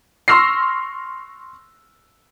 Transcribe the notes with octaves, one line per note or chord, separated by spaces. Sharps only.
C6 C#6 E6 F6 A#6 C7